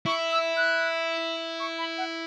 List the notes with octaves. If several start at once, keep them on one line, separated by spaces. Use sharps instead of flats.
E4 C#6
E6
F#6
C#6
B5
F#5